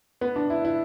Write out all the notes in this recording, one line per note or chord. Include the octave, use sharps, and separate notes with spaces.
B3
D4
E4
E4